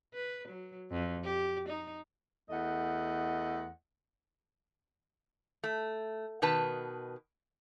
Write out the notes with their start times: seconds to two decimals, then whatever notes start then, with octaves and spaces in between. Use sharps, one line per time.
0.14 B4
0.48 F#3
0.91 F2
1.24 G4
1.68 D#4
2.50 E2 A3 D#5 F#5
5.64 A3
6.42 B2 D#3 B4 A5